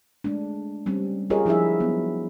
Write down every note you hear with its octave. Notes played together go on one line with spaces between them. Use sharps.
G#3 A3 D4
G3 C4 C#4
F4 G4 G#4 A#4 C#5 D#5
F3 D4 E4 G#4 E5
F#3 B3